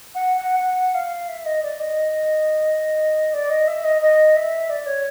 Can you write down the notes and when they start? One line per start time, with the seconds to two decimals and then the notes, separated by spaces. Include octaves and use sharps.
0.14 F#5
0.37 F#5
0.59 F#5
0.94 F5
1.28 E5
1.45 D#5
1.62 D5
1.79 D#5
3.33 D5
3.49 D#5
3.67 E5
3.84 D#5
4.01 D#5
4.36 E5
4.69 D5
4.86 C#5